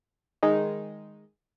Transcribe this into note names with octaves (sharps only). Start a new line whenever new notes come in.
D#3 G#3 D#4